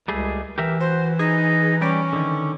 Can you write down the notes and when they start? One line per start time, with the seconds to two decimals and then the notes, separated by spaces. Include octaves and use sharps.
0.08 C#2 G3 A3 G#4
0.58 E3 G4 A#4 E5
0.80 F#4 C5
1.19 D#4 G#4
1.81 G3 C#4 G4 D5
2.13 D3 D#3